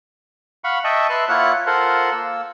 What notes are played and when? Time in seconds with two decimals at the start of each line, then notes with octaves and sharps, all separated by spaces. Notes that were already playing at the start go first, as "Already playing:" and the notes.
0.64 F5 F#5 B5 C#6
0.84 D#5 E5 G5 A5 C#6
1.10 B4 E5 A5 C6 F#6
1.29 A#3 E4 F4 C#5 F#5 F#6
1.66 F4 A4 A#4 C5 F#5
2.12 A#3 E6